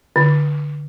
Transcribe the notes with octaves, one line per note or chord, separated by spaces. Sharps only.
D3